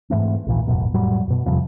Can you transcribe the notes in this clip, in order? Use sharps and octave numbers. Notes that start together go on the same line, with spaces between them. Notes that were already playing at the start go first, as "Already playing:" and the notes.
G#2 E3 A3 C4
A#1 D#2 A#2 E3
E1 A1 F#2 B2
F1 A2 F#3 G3
F#2 B2
E2 C3 F3 G3